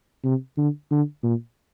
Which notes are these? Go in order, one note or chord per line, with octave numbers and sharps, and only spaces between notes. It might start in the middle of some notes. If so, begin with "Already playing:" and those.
C3
D3
D3
A#2